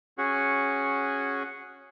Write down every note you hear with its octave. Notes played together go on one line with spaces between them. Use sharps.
C#4 F#4 G#4 F#5